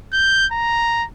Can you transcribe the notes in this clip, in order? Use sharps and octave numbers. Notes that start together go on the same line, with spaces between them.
G6
A#5